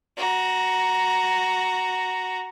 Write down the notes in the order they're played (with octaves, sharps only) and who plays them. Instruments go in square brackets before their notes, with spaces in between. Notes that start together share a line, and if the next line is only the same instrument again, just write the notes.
[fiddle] F#4 A#5